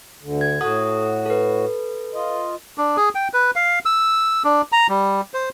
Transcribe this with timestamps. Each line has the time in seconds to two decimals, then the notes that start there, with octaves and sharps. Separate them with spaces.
0.23 D2 D3
0.41 G#6
0.61 A2 F#4 A4 F#5 D#6
1.26 A4 B4
2.14 F4 D#5
2.78 D4
2.97 G#4
3.15 G5
3.33 B4
3.56 F5
3.85 E6
4.44 D4
4.72 A#5
4.89 G3
5.34 C5